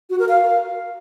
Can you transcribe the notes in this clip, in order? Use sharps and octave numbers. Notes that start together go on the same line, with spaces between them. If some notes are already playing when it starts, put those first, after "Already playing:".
F#4
A#4
F5